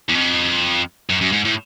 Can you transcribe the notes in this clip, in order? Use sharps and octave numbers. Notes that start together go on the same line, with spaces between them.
E2
F2
F#2
F#2
G#2
A2